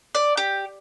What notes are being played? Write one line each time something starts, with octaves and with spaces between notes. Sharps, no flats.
D5
G4